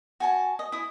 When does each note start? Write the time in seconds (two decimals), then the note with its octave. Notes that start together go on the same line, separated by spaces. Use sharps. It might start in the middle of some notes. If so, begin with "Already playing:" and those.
0.20 F#4 G#5 A5
0.59 D#5
0.72 E4 D#6